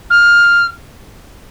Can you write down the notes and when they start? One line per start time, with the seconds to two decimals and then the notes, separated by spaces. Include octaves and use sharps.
0.10 F6